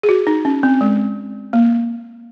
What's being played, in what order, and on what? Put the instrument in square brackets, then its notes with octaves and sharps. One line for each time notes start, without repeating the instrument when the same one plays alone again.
[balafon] G#4
F#4
D#4
C#4
C4
G#3
A#3